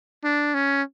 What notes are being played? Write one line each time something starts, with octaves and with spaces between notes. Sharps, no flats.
D4
C#4